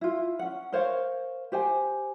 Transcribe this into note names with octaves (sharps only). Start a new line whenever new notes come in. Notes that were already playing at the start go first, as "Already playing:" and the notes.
E4 F4
C#4 F#5
A#4 C5 C#5 F5
G4 C5 G5 G#5